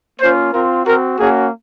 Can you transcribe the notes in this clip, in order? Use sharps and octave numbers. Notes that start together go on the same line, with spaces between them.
A#3 C#4 F4 C5
C4 F4 A#4
C4 F#4 A#4
A#3 C#4 F#4 G#4